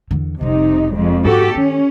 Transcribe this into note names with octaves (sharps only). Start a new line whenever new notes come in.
E2 D3
F1 C3 G3 D#4
F2 G#3
G#2 F#4 G4 A4
D#3 C#4